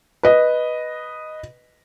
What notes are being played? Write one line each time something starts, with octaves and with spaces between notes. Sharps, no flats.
B4 D#5